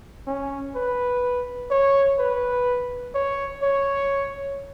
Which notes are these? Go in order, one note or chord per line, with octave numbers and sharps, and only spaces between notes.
C#4
B4
C#5
B4
C#5
C#5